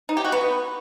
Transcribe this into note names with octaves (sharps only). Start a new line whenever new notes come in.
D#4
G4
F#4
B3